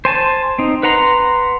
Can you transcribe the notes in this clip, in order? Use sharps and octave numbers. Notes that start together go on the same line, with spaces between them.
C5 G#5 A5
C4 D#4
B4 F#5 A#5 C6